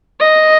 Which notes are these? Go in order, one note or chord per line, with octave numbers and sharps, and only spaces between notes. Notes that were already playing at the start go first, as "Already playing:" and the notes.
D#5